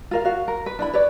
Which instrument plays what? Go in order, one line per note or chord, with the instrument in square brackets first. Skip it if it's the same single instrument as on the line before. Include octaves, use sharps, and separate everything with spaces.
[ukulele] F4 A#4 F5
F#4 F5
A#4
B4
D4 E4 B5
B4 C#5 D5